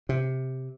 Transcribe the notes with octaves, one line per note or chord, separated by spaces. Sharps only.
C3